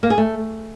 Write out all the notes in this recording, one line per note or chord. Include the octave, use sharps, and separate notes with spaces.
A#3
G#4
A3